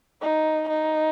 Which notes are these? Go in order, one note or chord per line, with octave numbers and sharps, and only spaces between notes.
D#4
D#4